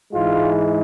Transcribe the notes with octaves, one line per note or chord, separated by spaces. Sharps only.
G#2 E3 G#3 F4